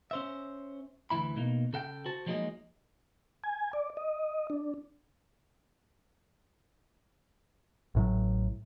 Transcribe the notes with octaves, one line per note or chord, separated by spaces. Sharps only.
C#4 C5 E5
D2 G#2 E3 E4 B5
B2 A#3 D#4
C#3 A4 F#5 G5
F#4 C5 A5
F3 F#3 G#3 A#3 D#4 D#5
G#5
D5
D#5
D4
A1 A2 F#3